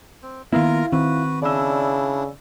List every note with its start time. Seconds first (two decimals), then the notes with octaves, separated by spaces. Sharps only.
0.22 C4
0.53 D#3 A#3 B3 E4 F4 A#4 F5 A#5
0.92 D#3 C4 F#4 B4
1.42 C#3 D4 E4 D5 E6